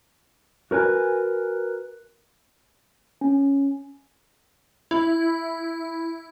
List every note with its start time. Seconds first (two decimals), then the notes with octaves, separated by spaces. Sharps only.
0.71 F#4 A#4 B4 G#5
3.21 C#4
4.91 E4